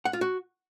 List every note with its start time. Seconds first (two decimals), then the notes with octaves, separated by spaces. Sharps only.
0.05 F#5
0.13 F4
0.21 F#4